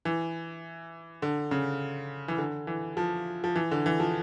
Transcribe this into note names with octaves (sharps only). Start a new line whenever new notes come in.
E3
D3
C#3
E3
D3
E3
F3
F3
E3
D3
E3
F3